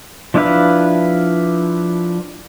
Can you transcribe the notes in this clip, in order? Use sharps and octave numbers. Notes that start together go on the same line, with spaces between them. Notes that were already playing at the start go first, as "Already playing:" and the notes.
F3 D4 E4 B4 F5